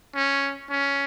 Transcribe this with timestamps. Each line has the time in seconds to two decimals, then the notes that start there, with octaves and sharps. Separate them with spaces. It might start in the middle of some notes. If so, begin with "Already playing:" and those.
0.15 C#4
0.70 C#4